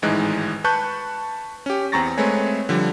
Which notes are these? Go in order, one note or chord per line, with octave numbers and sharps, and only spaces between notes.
G#1 A2 E3 G#3 D#4 F#6
B4 A5 C#6 F#6 G6
C#4 G4
E2 C4 A#5 C#6 A6 A#6
G#3 A3 C4 B4 C#5 G#5
D3 F3 G3